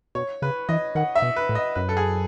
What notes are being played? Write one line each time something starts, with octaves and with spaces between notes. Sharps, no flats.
B2 C#5
C#3 B4
E3 D#5
D#3 F#5
E5
B2
B4
A2
D#5
F#2 B4
A4
G#4